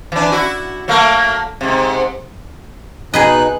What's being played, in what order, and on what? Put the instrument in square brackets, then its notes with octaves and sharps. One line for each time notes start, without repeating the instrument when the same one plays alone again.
[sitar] E3 D4
E4 F#4
F#3 A3 A#3
G#2 C3
[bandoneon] B2 D#4 F#6 [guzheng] G#4 B4 D#5